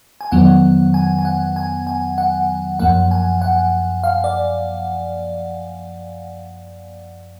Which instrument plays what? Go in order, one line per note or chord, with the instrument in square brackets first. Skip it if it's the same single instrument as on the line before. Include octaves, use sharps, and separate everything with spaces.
[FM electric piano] G#5
F2 D#3 F#3 B3 F#5
G#5
G#5
F#5
G#5
G#5
F#5
F#2 F3 A#3 F#5
G#5
F#5
F5
D5